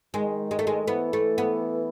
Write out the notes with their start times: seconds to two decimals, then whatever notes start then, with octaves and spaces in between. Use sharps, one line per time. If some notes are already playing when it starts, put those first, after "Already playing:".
0.14 D#3 G#3
0.51 G#3
0.59 A3
0.67 G#3
0.88 E3 B3
1.13 A3
1.38 B3